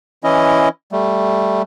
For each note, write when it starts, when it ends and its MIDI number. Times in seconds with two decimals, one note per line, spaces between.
0.24 0.69 52
0.24 0.69 61
0.24 0.69 64
0.24 0.69 75
0.92 1.62 55
0.92 1.62 57